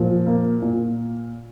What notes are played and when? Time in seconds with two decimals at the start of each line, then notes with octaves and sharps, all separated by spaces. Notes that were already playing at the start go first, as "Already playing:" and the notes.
Already playing: A#2 F3
0.27 A#3
0.62 A#2